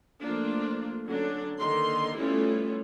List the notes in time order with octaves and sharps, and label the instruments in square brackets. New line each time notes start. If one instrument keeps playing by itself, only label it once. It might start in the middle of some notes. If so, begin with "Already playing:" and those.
[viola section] F3 A3 A#3 D4 F4
D3 F#3 C#4 D4
D3 D#3 A#3 C6
G3 A3 B3 C#4 E4 F4